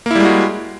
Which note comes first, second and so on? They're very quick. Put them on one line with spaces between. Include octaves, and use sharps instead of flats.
A#3 E4 G3 G#3 F#4